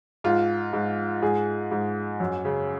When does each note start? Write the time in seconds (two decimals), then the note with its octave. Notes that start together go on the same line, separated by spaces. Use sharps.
0.24 G#2 F4
0.73 G#2
1.22 G#2 G#4
1.71 G#2
2.20 F#2
2.45 C#3